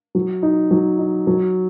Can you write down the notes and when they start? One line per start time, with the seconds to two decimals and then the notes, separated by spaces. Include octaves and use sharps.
0.15 F#3
0.43 D#4
0.71 F#3
0.98 D#4
1.27 F#3